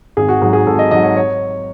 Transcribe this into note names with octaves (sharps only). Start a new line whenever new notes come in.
G#1 G#4
F#4
G#2 F#3 G#4
G#4
G#1 A4
D#5
G#2 F#3 D#5
C#5
C#5